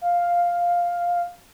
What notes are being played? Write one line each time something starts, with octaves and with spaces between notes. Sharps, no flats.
F5